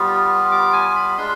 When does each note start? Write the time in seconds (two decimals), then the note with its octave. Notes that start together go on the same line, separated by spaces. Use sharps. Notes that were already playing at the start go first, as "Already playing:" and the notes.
Already playing: G3 B3 F4
0.51 D6
0.73 G#5
0.96 B5
1.18 G#3 D4 F4 C6